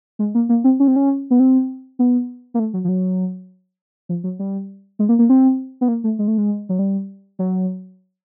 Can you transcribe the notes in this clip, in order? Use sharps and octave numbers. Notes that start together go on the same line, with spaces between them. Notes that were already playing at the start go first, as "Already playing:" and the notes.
G#3
A#3
A#3
C4
C#4
C4
C#4
B3
C4
B3
A#3
A3
F#3
F3
F#3
F3
F#3
G3
G#3
A#3
A#3
C4
B3
A#3
A3
G#3
A3
G#3
F#3
G3
F#3